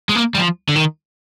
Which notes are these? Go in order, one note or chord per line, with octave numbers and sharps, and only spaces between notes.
G#3
A#3
G3
F3
D3
D#3